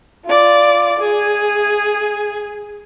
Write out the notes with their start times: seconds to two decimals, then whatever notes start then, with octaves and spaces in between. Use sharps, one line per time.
0.25 F4 D5
0.99 G#4